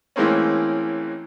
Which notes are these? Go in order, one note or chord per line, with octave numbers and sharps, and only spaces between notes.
A2 E3 G#3 A#3 C4 C#4